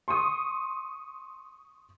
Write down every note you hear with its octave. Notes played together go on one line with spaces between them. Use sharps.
C6 C#6 D#6